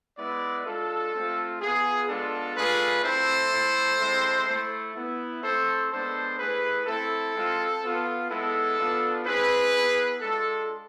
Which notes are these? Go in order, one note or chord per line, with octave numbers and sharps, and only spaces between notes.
G#3 B3 E4 B4 D5
G#3 D4 F4 A4
A3 C4 F4
B3 F4 G#4
G#3 B3 D4 F4 A4
A3 D4 F4 G#4 B4
A3 C4 E4 A4 C5
A3 E4
G#3 C4 E4
A3 E4
B3 E4
A3 C4 E4 A4 C5
G#3 B3 D4 A4 C5
A3 E4 G#4 B4
A3 C4 E4 A4
G#3 C4 F4
B3 F4
G#3 B3 E4 A4
B3 D4 F4
G#3 C4 E4 G#4 B4
B3 E4
G#3 D4 F4 A4